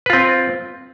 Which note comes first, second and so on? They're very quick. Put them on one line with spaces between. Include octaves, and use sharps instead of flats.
B4 F4 C4